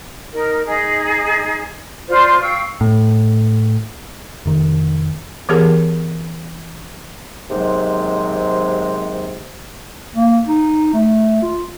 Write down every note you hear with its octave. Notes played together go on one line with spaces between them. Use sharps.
D#4 A#4
D#4 G#4
F4 C5 D5
F5 G5 C#6 E6
A2
F1 D#3
E3 B3 G4 G#4 A#4
D#2 G#2 C3 F#3 G#3
A#3
D#4
A3
F4